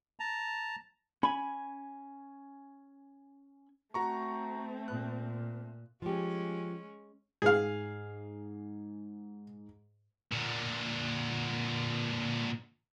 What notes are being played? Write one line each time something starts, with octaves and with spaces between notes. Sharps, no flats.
A5 A#5
C#4 G#5 B5
A3 C4 F#4 A#5 C#6
A#2 F#6
F3 G#3 C#4 G4
G#2 G#4 F5
A#2 D3